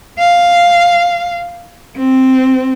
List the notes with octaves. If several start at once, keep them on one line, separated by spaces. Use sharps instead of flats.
F5
C4